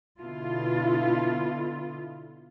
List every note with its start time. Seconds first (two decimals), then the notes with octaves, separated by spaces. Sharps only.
0.20 B2 D3 B3 E4 F4 A4